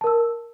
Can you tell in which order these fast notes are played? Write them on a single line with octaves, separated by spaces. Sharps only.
A5 A#4 E6